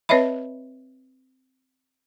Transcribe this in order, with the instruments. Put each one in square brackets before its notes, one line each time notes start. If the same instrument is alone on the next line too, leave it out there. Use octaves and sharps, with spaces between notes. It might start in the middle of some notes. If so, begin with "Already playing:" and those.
[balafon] C4 B4 C#5 D#5 E5 B5